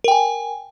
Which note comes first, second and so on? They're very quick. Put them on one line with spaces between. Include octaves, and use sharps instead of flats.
A#4 G5 G#5